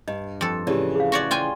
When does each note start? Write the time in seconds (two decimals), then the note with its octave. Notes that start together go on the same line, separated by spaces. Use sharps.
0.08 G2 D#5
0.41 F2 A4
0.67 A2 C#3 E3 G4 D5
0.95 G#4 F5
1.12 F#4 C#5 D5
1.31 F4 G5 G#5